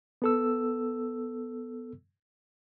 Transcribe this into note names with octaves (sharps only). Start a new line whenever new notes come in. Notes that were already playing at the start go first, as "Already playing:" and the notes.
B3 A4 E6